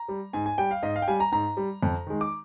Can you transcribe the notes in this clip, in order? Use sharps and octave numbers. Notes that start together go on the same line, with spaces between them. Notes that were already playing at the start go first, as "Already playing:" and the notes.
Already playing: A#5
G3
G#2 G#5
G#5
G3 G5
F5
G#2 D#5
F5
G5
G3 G#5
A#5
G#2 A#5
G3
F2
D#3 G#3
D6